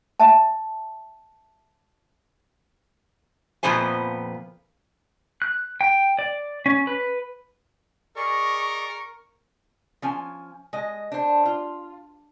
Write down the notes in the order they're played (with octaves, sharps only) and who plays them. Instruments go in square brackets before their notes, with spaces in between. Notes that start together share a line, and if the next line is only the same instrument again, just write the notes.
[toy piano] E5 A5
[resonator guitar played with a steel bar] F2 A#2 F3 B3 C5 G#5
[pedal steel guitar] F#6
G5
D5
C#4
B4
[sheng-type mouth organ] G#4 D5 D#5 [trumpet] A#4 [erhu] C#6
[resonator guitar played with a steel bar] F3 C#4 G#5
G#3 D#5
D4 C5
F4